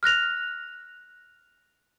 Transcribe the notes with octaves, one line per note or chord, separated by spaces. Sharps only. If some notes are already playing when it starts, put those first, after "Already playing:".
F6 F#6 A#6 F7